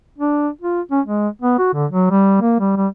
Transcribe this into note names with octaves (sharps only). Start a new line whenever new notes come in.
D4
F4
C#4
G#3
B3
F#4
D3
F#3
G3
A#3
G3
G3